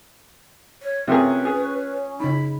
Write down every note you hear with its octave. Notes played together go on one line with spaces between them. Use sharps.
C#5
C3 A3 C#4 F4 G#4 A#4 B4
G#4
C#3 D#4 B5